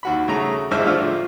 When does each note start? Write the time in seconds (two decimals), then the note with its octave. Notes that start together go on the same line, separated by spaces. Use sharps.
0.03 D#2 F#4 B5
0.28 C#3 A3 A#5
0.71 A1 D3 G#3 C5 E5 F6
0.85 F3 A3 D4 F4 F5